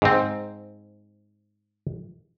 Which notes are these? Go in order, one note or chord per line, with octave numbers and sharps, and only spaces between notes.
G#2 C4